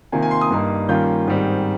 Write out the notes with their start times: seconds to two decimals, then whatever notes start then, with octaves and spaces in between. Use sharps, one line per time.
0.12 C3 D#3 A#3 F4 G#5
0.22 G#5
0.31 C6
0.41 D#6
0.50 G2 G3 A#3 D#4
0.89 D#3 G3 A#3 C#4 F4 G6
1.27 G#2 D#3 G3 C4